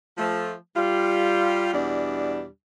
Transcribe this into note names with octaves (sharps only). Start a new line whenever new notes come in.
F3 A3
G3 F4
E2 B2 G3 D4